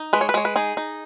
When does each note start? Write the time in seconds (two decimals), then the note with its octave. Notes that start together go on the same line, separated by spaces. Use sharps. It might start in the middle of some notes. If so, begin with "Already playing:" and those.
Already playing: D#4
0.13 G#3 B4
0.21 C#5
0.29 B4
0.34 G#3 C#5
0.45 B4
0.56 D#4 G#4
0.77 D#4